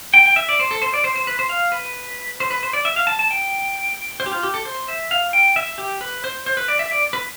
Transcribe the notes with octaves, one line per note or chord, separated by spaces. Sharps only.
G5
G5
E5
D5
C5
A4
C5
D5
C5
C5
B4
C5
F5
B4
C5
B4
C5
D5
E5
F5
A5
A5
G5
C5
G4
F4
G4
A4
C5
E5
F5
G5
E5
G4
B4
C5
C5
B4
D5
E5
D5
B4